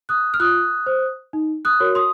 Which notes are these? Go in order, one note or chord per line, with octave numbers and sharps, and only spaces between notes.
D#6 F#6
F6
F4 D#6 F#6
C5
D#4
D#6 F#6
F#4 A#4 C#5
C6 D#6